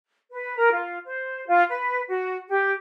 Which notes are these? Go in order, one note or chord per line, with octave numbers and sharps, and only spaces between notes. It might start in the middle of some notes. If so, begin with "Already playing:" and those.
B4
A#4
F4
C5
F4
B4
F#4
G4